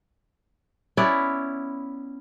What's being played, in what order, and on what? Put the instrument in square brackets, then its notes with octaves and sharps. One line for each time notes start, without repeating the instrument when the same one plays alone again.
[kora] B3 C#4 E4 D5